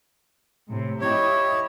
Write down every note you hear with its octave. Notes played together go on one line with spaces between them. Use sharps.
A2 C3
E4 G4 C#5 D#5